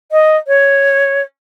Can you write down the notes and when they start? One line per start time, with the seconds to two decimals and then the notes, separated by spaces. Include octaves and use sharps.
0.11 D#5
0.47 C#5